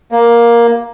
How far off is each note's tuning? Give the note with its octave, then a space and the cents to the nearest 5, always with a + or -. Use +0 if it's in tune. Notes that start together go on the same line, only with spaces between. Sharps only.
A#3 +10